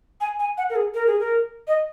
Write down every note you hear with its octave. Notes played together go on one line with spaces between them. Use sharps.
G#5
G#5
F#5
A#4
G#4
A#4
G#4
A#4
D#5